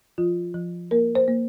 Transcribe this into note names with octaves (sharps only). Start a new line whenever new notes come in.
F3 F4
F3
A#3 A#4
C5
A#3